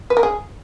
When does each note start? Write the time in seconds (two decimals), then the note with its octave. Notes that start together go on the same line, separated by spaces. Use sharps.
0.10 B4
0.17 A#4
0.23 G#4